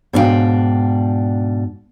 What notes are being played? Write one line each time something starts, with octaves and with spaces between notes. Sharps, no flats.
G#2 B2 D4 B4 F5 G5